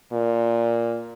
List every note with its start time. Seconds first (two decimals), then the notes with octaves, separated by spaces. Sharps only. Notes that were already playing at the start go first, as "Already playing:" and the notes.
0.12 A#2